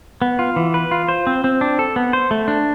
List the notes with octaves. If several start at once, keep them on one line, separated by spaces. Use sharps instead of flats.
B3
F4
E3
B4
F4
C5
C4
C4
D4
A4
B3
C5
A3
D4